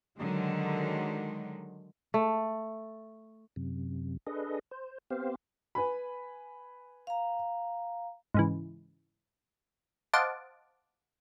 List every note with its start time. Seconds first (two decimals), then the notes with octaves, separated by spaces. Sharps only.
0.19 D3 D#3 F#3 G#3
2.14 A3
3.56 F#2 C3
4.27 D4 G#4 A4 B4 D#5
4.71 C5
5.11 B3 C4 G4 C5 F5
5.75 B4 G#5 B5
7.07 F5 A#5
8.34 G#2 C#3 E3
10.13 C5 D#5 F5 F#5 A5 D6